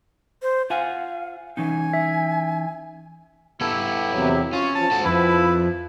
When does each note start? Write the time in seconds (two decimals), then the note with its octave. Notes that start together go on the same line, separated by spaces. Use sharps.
0.42 C5
0.70 F4 F5 F#5 G#5
1.57 E3 C#4 D#4 G#5
1.93 E5
3.61 B3 E4 G4 A4
4.10 E2 C3 F#3
4.53 C#4 F4 C#5
4.75 F3 A5
4.92 G#2 F#4 A4
5.05 F2 F3 E4 B4